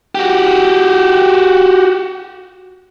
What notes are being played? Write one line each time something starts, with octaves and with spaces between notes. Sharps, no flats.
F#4 G4